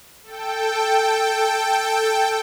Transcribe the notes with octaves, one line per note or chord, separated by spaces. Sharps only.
A4 G5